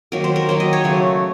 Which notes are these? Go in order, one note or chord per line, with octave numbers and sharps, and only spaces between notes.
D#3 F#3 A#3 A#4
C5
A#4
D#3 F#3 A#3 C5
D#5
C#5
C#3 F#3 A3